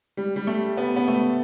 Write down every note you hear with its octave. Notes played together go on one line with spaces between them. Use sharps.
G3
G3
A3
B3
B3
A3